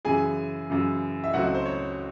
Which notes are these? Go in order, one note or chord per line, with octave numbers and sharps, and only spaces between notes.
F#2 C#3 E3 G#4 G#5
F#2 C#3 E3
E5
C#2 C#3 F#3 A3 C4 F#4 F#5
C5
C#5